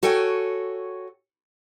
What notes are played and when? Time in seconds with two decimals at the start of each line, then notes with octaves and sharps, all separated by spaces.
0.03 F#4 A4 C#5 G5 G#5